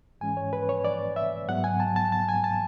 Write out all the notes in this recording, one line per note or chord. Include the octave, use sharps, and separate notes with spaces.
G#2 E3 G#3 C#4 G#5
C#5
B4
C#5
D5
E5
G#2 F#3 B3 F#5
G#5
A5
A5
A5
G#5
A5